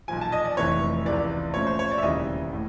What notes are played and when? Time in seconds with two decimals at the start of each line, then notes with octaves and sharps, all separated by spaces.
0.08 B1 A#2 F3 G#5
0.21 A5
0.32 D#5
0.45 D5
0.57 F1 F2 C3 E3 A3 C#5
1.05 C#2 C3 E3 D5
1.54 A#2 F3 A3 C#4 C#5
1.67 C5
1.79 C#5
1.91 D5
1.98 E5
2.03 E1 D#2 C#3 E3 G3 D#5
2.53 A2